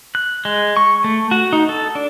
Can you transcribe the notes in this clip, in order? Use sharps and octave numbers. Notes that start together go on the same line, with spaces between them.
F#6
G#3
C#6
A3
F#4
D#4
A4
D4